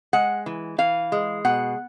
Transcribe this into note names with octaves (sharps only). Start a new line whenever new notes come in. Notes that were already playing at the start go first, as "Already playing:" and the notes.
G#3 F#5
E3
E3 F5
G#3
B2 F#5